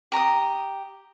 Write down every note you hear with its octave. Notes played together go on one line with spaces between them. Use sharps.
G4 A#5 C#6 D#6